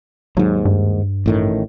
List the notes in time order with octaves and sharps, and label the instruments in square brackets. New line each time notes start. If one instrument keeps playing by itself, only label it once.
[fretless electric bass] D#2 G#2 [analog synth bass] F#3
[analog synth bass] G2
[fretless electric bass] A1 A2 D#3